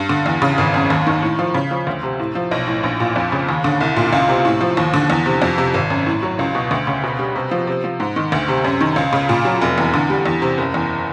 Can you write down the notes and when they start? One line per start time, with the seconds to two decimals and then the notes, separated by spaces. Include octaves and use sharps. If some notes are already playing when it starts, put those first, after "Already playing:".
Already playing: G2
0.09 D3
0.26 E2
0.42 C#3
0.58 G#1
0.74 F#2
0.90 D#2
1.07 D#3
1.22 A2
1.39 F3
1.54 C#3
1.71 F3
1.87 D2
2.03 C3
2.19 A2
2.35 F3
2.51 B1
2.67 A2
2.84 A#1
3.00 A#2
3.16 F2
3.32 C#3
3.49 D#2
3.64 D3
3.81 C2
3.96 A#2
4.13 C#2
4.29 C3
4.45 A2
4.61 F3
4.77 D#2
4.94 D3
5.10 E2
5.26 C3
5.42 F2
5.58 C3
5.74 G#1
5.90 F#2
6.06 A2
6.23 F#3
6.39 C#2
6.55 B2
6.71 D2
6.87 C#3
7.03 B2
7.19 G3
7.36 C3
7.51 F3
7.67 C3
7.84 F3
8.00 G#2
8.16 D#3
8.32 D2
8.48 C3
8.64 F#2
8.81 D#3
8.96 C#2
9.13 C#3
9.29 A#2
9.45 F#3
9.62 F1
9.78 E2
9.94 D3
10.10 G3
10.26 E2
10.42 C3
10.58 F#1
10.74 E2